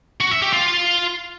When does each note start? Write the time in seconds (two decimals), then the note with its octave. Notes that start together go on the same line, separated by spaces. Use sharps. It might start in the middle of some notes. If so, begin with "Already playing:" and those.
0.21 F#4
0.31 E5
0.42 G4
0.53 F4